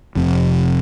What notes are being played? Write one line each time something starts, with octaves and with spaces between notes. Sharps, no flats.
F1 F2 C3